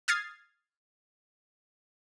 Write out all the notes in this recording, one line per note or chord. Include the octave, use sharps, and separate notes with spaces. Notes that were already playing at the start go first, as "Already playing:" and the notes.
D#6 F6 G#6 A6 C7